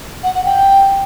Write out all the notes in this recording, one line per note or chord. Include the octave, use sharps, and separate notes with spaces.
F#5
F#5
G5